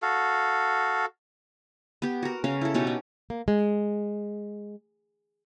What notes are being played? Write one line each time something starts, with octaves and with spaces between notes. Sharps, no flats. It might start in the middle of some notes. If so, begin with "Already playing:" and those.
F#4 A4 F5
B3 G4
F#4 A#4
C#3 C#4 A#4 F5
E4 A4
B2 C#4 D#4 G4
C#4
A#3
G#3